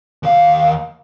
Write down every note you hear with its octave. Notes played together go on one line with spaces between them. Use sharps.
D#2 F5